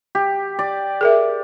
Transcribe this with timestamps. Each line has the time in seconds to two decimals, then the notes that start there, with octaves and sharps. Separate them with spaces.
0.15 G4
0.59 D5
1.01 G#4 A#4 E5